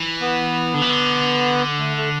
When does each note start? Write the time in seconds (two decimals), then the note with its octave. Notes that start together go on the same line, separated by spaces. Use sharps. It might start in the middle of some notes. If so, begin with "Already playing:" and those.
Already playing: E3
0.21 B3
0.74 D3
0.82 E3
0.90 D3
1.79 A3
1.97 A3